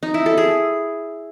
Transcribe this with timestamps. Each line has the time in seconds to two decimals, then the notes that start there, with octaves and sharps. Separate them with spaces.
0.03 D#4
0.14 E4
0.26 A4
0.38 G#4